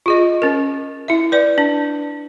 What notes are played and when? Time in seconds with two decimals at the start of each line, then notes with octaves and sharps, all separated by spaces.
0.06 F4 G#4 D#5
0.42 C#4 A#4
1.08 E4 E5
1.32 B4 D5
1.58 D4